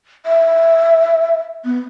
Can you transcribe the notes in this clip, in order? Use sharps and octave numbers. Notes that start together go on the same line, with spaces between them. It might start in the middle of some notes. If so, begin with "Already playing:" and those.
E5
B3